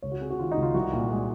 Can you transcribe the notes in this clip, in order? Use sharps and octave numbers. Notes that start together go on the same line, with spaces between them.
C#2 C#5
F#4
C3 G#4
F#4
D#3 F4
D#4
C#2
F4
C2 F#4
A#2
G#3